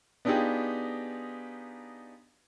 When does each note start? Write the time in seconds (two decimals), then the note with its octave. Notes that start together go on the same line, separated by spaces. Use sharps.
0.25 B3 D4 D#4 F4 G4 G#4